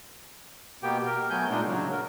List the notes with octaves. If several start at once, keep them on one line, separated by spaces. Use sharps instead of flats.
B2 A#3 B3 G4 G5
A#4
F#3 A3 B3 G#5 G6
A#2 G#3 D4 D#4
C#3 F#3
A#4